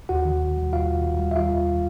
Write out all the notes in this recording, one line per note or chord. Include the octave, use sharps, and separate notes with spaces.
D#2 F#4 F#5
D#3
D#2
G3
D#2 F4 F5
D#3
D#2
G3
E5
D#2 F4 F5
D#3